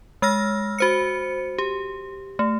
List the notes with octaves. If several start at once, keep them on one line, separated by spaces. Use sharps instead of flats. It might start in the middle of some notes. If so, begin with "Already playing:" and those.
G#3 E6 F6 A#6
F#4 C5 C#7
G4
A3